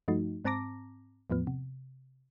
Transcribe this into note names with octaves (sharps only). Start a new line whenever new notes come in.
G2 F3 A3 D#4 F#4
G#2 C4 A5 A#5 D6 A#6
E2 A2 F3 B3
C3